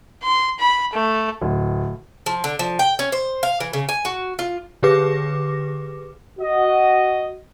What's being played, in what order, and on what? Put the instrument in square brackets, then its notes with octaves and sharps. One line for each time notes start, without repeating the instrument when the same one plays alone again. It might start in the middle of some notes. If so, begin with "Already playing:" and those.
[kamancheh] C6
B5
A3
[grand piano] D1
[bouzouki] F3
D3
F3
G5
C#4
C5
F5
E3
C#3
G#5
F#4
F4
[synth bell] D3 G4 G#4 B4 D6 A#6
[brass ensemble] F#4 D#5